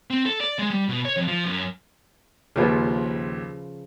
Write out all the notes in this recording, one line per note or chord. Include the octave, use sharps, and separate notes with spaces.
C4
A4
D5
G#3
G3
B2
C#5
F2
F3
F#2
A#1 D#2 C#3 F3 B4